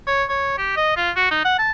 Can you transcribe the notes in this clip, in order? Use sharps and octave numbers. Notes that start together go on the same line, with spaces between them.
C#5
C#5
G4
D#5
F4
F#4
D#4
F#5
A5